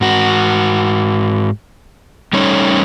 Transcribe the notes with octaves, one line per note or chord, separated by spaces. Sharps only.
G#2 F#4
G3 A3 C#4 D#4 C#5